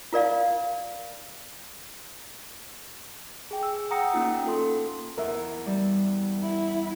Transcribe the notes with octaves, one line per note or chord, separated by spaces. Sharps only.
F4 A#4 D5 F5
G#4 G5
E6
F#5 G5 A#5 D#6 A#6 C#7
A#3 C#4 D#4 F4
A#3 F4 A4 C6
E2 A#4 E5
G3
E4